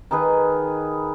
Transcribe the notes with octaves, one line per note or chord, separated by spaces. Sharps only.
D#3 D#4 G#4 B4